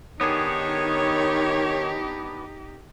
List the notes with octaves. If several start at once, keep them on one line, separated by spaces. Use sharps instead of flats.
D#3 B3 D4 D#4 G4 G#4 C#5